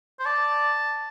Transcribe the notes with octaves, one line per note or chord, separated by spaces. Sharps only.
C5
D5 A5